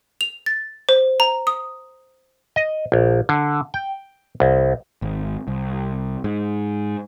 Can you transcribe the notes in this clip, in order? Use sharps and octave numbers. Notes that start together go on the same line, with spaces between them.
F7
A6
C5
A#5
D#6
D#5
A#1
D3
G5
C2
G#1
C2
G#2